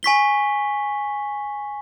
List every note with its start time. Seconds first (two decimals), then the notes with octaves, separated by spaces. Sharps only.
0.03 G#5 C#6 B6 G7